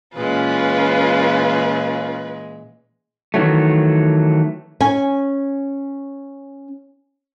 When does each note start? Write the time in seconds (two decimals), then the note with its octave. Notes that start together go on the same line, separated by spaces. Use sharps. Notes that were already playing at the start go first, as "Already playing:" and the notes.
0.16 A#2 E3 G#3 C#4 F4 B4
3.34 D#3 E3 F#3 A3
4.80 C#4 G#5